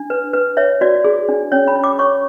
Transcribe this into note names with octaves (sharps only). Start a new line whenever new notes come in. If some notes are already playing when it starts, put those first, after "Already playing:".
Already playing: D4
B4
B4
C#5 E5
F#4 D5
G#4
D4
C#4 C#5
B5
C#5
D6
C#5 C#6